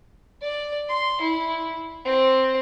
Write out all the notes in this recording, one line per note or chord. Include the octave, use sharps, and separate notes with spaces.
D5
C6
E4
C4